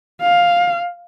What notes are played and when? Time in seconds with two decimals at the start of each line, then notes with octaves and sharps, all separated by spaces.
0.21 F5